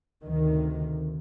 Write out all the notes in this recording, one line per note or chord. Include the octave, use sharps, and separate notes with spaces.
D2 C3 D#3